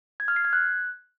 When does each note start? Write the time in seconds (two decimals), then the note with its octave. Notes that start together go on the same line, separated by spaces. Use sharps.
0.20 G#6
0.28 F6
0.36 C7
0.45 G#6
0.53 F#6